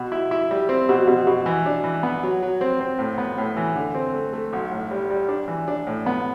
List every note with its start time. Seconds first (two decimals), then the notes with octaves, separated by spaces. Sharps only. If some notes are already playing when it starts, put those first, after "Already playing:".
Already playing: B2
0.12 E4
0.31 E4
0.51 G3
0.69 C4
0.89 B2
1.07 B2
1.27 B2
1.46 E3
1.66 D4
1.84 E3
2.03 B3
2.23 F#3
2.42 F#3
2.61 C4
2.81 C4
2.99 A2
3.18 B3
3.38 A2
3.57 E3
3.75 D3
3.95 C4
4.14 A3
4.33 A3
4.53 B1
4.71 A2
4.91 G3
5.10 G3
5.29 D4
5.48 E3
5.68 D4
5.87 A2
6.06 B3